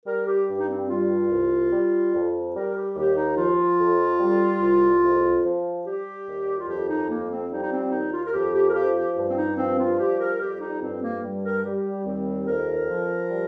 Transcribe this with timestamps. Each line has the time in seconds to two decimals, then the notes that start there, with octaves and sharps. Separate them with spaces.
0.06 G3 A#4
0.27 G4
0.48 G2
0.59 D#4
0.68 C4
0.89 G3 F4
1.30 C2
1.72 G3
2.13 F2
2.54 G3 A#4
2.75 G4
2.95 D#2 G4
3.16 D#4
3.37 F3 F4
3.79 F2
4.19 G3
4.61 C2
5.02 F2
5.44 F3
5.85 G3 G4
6.27 D#2
6.58 F4
6.67 F2 G4
6.89 D#4
7.10 F3 A#3
7.30 C4
7.51 G3 D#4
7.62 D#4
7.72 C4
7.91 D#2 D#4
8.12 F4
8.26 A#4
8.33 F2 G4
8.54 G4
8.69 A#4
8.74 F3 G4
8.95 G4
9.16 G2
9.30 C4
9.37 D#4
9.57 F3 C4
9.78 F4
9.98 G3 G4
10.19 A#4
10.40 F2 G4
10.61 D#4
10.81 G2 C4
11.01 A#3
11.22 G3
11.43 A#4
11.64 G3 G4
12.05 D#2 C4
12.47 F2 A#4
12.88 F3
13.30 G3